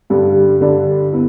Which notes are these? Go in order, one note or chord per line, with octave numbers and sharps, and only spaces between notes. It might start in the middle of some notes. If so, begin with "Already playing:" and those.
G2 D3 G3 D4
G2 D3 G3 D4
B3 E4